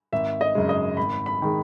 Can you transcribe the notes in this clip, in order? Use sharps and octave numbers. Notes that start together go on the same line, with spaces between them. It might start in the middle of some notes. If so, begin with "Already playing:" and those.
G#1 E5
D#5
F#2 C#3 G#3
D#5
G#1 B5
B5
D#3 G#3